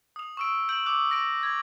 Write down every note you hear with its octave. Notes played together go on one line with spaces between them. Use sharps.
D#6 F7
C#6 E6 D7
G6 D7 F#7
D6 E6 F#6
A#6 D7
G#6